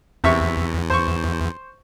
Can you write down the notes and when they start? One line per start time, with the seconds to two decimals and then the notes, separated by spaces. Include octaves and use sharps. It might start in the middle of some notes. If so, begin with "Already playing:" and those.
0.24 E2 C3 E5 C#6
0.90 C5 C#6